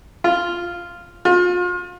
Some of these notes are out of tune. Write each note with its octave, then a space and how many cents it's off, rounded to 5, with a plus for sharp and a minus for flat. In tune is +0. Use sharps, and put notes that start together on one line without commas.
F4 -5
F4 +35